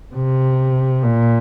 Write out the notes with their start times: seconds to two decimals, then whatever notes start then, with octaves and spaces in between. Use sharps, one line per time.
0.15 C3
1.04 A#2